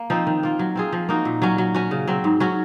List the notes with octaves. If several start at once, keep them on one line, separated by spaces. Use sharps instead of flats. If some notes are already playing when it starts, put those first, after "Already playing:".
Already playing: A#3
F3 C4 D#4
D#3
A#3 F4
F#3
C4 F4 G#4
F3
A#3 D#4 F#4
A#2
F#3 C#4
F#3
C#4 F#4
C#3
F#3 C4
G#2
F#3 C#4 F#4